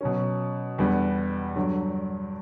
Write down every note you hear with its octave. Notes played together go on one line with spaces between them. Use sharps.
B2 F#3 C#4
E2 D3 G3 B3
G2 D3 F#3